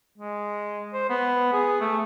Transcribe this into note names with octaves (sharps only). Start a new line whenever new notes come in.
G#3
C5
B3
G#4
A3